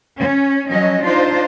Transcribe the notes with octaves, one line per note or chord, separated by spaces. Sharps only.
C#4
F3 F#3 C#4 D#5
D4 D#4 F4 C5